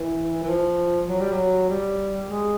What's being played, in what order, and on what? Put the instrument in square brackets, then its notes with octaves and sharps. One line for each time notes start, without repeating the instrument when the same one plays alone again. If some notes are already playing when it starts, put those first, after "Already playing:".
Already playing: [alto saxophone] E3
E3
F3
F#3
G3
F#3
G3
G#3